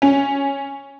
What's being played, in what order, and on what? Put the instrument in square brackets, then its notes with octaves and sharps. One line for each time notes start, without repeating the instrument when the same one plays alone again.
[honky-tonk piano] C#4